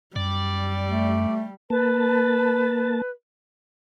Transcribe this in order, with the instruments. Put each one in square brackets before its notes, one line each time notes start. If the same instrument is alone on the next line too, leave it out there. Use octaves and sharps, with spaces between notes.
[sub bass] F#2 [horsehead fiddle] G3 [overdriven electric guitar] D5
[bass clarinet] A3
[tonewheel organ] A#3 A5 [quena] B4